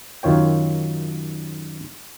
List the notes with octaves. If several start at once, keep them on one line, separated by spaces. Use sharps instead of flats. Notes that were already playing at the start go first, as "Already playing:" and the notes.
F#2 D#3 F4 C#5 G5